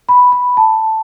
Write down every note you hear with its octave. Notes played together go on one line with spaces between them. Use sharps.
B5
B5
A5